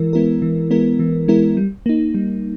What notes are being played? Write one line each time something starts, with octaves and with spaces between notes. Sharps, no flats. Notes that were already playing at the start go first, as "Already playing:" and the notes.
Already playing: E3 G#3 E4 A#4
G#3 B3 E4 A#4
E3
G#3 B3 E4 A#4
E3
G#3 B3 E4 A#4
G3
A#3 D#4
G3